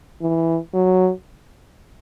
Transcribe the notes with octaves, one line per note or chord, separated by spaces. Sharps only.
E3
F#3